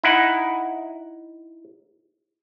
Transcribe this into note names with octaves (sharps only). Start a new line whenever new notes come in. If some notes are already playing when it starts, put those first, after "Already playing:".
D#4 E4 F#5